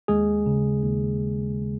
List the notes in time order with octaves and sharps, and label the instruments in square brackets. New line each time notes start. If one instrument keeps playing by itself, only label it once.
[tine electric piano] D#2 G#3 G#4
C#3
D#2